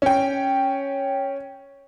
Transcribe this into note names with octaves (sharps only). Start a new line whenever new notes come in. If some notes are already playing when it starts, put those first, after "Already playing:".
C#4 G5